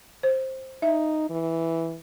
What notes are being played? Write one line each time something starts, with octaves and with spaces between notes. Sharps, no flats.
C5
D#4 E5
E3